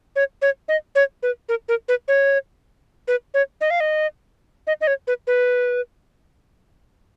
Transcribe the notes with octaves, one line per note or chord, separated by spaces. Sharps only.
C#5
C#5
D#5
C#5
B4
A#4
A#4
B4
C#5
B4
C#5
D#5
F5
D#5
D#5
D#5
C#5
B4
B4